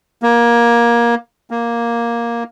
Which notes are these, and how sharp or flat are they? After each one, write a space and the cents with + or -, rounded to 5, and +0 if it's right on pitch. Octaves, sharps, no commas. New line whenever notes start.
A#3 +20
A#3 +5